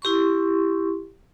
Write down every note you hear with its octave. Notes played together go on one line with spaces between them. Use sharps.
E4 G4 C6 C#6